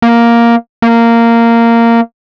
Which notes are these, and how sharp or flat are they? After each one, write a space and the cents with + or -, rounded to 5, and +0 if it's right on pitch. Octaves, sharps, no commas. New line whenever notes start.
A#3 +5
A#3 -10